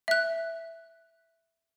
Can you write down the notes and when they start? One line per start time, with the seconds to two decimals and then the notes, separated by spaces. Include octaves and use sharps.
0.08 E5 F#6